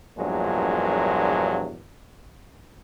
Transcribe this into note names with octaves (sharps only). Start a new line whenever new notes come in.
A#1 E2 G2 A#2 F#3 G#3